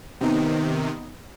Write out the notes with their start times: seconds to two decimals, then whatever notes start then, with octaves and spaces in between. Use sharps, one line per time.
0.21 C3 D#3 B3 D#4